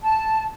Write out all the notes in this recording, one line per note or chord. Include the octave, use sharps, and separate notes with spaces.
A5